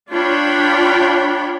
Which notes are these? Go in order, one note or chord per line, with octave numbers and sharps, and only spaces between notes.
D4 F4 C#5 G5 B5